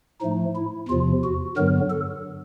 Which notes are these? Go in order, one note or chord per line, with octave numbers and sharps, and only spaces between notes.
A2 F3 A3 D#4
E4
E2 C3 F3 F4
F#4
G2 D3 F#3 B3 A#4
A4